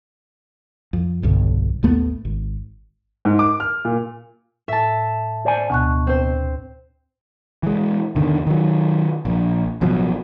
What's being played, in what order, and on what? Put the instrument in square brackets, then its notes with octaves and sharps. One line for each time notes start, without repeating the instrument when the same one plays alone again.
[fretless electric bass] F2
D#1 B1 G2 D3
A1 D#2 A3 B3
G#1
[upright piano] G#2
D6
F6
A#2
[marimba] A2 [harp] E5 A5
[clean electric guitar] C5 D5 G#5
[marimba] D2 C#6 F#6 [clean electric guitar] B2
[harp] C4 C5
[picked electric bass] E3 G#3
E2 D3 D#3
D#3 F#3
A#1
A1 B2 F3 F#3